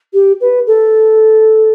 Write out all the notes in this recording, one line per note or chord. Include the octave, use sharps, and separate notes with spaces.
G4
B4
A4